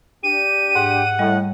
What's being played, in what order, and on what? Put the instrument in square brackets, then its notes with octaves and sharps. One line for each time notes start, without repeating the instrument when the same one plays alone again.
[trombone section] D4 G4 [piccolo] D#7
[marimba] G#2 [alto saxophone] F#5
[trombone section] A2 [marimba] G3 D#5